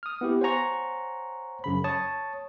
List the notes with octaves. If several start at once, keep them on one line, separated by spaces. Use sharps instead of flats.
D#6 F6
B3 E4 G4
C5 C#5 F#5 G#5 A#5 C#6
F#2 C#3 B5
C#5 A5 C#6 D#6